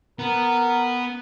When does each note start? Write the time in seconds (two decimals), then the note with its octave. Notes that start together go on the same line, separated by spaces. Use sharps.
0.19 B3 A#4